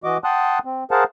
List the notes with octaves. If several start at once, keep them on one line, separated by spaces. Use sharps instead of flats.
E3 F#4 D#5 D6
F#5 G5 A5 C6 D#6 F#6
C4
G#4 A#4 C5 F5 F#5 A5